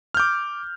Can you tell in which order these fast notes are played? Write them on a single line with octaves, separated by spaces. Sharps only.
F6 G6 D6